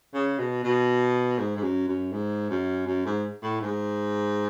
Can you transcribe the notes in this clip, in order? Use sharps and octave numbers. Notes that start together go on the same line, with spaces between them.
C#3
B2
B2
G#2
G#2
F#2
F#2
G#2
F#2
F#2
G#2
A2
G#2